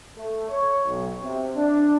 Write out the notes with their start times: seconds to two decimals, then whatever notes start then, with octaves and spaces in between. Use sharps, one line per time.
0.17 A3
0.50 C#5
0.86 B1
1.22 C3
1.56 D4